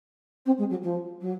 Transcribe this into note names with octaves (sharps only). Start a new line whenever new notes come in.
C4
G#3
F#3
F3
F#3